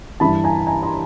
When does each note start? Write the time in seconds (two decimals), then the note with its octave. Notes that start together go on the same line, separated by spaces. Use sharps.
0.20 G2 E3 A5 B5
0.44 G#5 A#5
0.67 G#5 A#5
0.83 A#5 C6